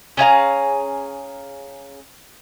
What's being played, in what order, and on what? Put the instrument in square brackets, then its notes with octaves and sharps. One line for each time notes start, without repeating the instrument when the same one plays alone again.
[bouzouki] C#4 G#4 F5 A#5